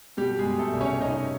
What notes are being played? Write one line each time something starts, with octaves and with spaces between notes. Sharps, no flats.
B2 G3 G4
G#3 G#4
B2
A3 A4
C2
C#4 C#5
C2 D#4 D#5